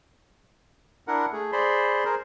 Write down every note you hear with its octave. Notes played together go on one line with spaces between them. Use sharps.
D4 E4 A#4 F#5
A3 G#4
G#4 C5 D5 B5 C6
G#4 A#4 C5